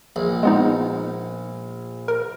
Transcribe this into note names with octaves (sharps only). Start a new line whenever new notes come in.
A#1
G#3 B3 D#4
A#4